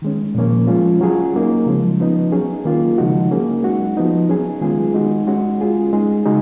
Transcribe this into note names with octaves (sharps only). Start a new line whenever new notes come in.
D#3 G#3 C#4
A#2 F3 A#3 C#4
F3 G#3 C#4 F4
F#3 C#4 F4 G#4
F#3 A#3 D#4
C#3 F3 G#3 C#4
F3 B3 D#4
F#3 C#4 G#4
D#3 A#3 F4
C#3 F3 G#3 D#4 F#4
F#3 A#3 C#4 G#4
G#3 D#4 F#4
F3 B3 D#4
F#3 C#4 G#4
D#3 G#3 B3 F4 G#4
G#3 D#4 F#4
G#3 C#4 F#4
G#3 C#4 F4 G#4
G#3 D#4 G#4
C#3 G#3 D#4 F#4